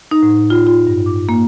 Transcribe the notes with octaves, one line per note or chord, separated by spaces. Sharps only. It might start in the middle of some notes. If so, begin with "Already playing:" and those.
D#4
A2
F4
F4
G2
D6
A#3